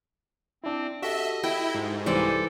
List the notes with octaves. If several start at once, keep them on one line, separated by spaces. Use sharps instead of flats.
C4 D4 E4
F#4 G4 A4 D#5 E5
E4 G5
G#2
C2 E3 G3 A4 C5 D5